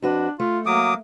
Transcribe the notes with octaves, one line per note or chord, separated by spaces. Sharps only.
F2 D4 F#4 B4
A3 F4
F#3 A#3 D6 D#6